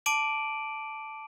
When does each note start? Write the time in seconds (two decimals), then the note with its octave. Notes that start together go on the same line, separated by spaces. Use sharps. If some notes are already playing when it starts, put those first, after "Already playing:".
0.06 A5 D6 D7 D#7 F#7